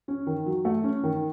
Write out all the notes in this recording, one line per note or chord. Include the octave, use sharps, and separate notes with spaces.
C#4
D#3
F#3
A3
C#4
D#3